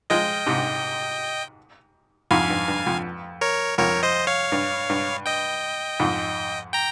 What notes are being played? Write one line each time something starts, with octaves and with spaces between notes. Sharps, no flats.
F3 G#3 D#5 G5
G#2 C3
F2 G#2 F5 G#5
G2
G2
F2
A#4 C#5
F2 A#4 C#5
C5 D#5
C#5 F5
G2
G2
D#5 G5
F2 G#2
G5 A#5